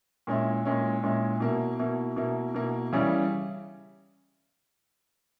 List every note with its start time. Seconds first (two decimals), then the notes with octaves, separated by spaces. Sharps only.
0.27 A#2 G#3 C#4 E4
0.65 A#2 G#3 C#4 E4
1.03 A#2 G#3 C#4 E4
1.40 B2 A#3 E4
1.79 B2 A#3 E4
2.16 B2 A#3 E4
2.54 B2 A#3 E4
2.93 C#3 E3 G3 C#4 E4